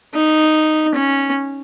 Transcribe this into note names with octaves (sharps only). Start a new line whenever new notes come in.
D#4
C#4